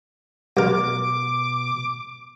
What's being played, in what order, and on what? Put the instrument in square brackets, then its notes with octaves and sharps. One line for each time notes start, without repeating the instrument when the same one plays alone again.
[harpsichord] F#2 A#4 [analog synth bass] B2 [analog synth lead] D6